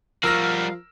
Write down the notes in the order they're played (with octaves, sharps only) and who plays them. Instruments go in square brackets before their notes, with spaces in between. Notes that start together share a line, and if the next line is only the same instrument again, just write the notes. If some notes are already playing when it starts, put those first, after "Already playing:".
[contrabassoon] F3 [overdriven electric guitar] G3 F#4 [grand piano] A#4 E6 A#6 [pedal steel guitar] F5